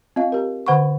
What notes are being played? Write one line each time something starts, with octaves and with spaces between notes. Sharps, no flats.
C4 F4 D#5 F5
G4 A#4
D3 C5 F#5 B5 C#6